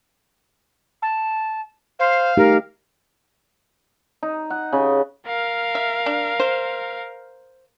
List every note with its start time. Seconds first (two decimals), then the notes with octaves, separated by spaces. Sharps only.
1.02 A5
1.99 C5 F5
2.37 A3 D#4 G4 A#4
4.23 D#4
4.50 F#5
4.72 C#3
5.27 A#4 F5
5.75 E5
6.06 D4
6.40 C5